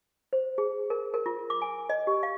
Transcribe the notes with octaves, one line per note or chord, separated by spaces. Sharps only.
C5
G#4
A#4
A#4
F4
D6
G#5
D#5
G4
F5